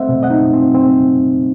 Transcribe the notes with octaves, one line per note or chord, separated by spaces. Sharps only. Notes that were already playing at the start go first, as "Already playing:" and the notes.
Already playing: A3 C4 C5 D#5 E5 F#5
B2
D#5 F#5
D#4
C4
C4